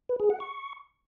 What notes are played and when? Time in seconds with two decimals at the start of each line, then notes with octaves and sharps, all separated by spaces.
0.09 B4
0.20 G#4
0.30 F#5
0.40 C#6